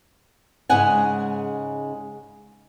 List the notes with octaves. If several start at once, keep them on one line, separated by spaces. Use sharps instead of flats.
G#2 C#3 G#3 D#5 F#5 G#5